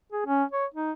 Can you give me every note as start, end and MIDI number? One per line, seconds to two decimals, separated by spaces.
0.13 0.24 68
0.26 0.44 61
0.52 0.65 73
0.74 0.92 63